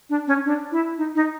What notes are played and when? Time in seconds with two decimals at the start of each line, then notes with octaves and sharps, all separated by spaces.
0.10 D4
0.27 C#4
0.45 D4
0.72 E4
0.97 D#4
1.15 D#4